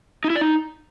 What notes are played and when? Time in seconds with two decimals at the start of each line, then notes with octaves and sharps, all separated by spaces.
0.24 D#4
0.30 E4
0.36 D5
0.41 D#4